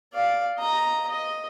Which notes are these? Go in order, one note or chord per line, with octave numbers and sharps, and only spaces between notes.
D5 F5
D#5 A#5
D#5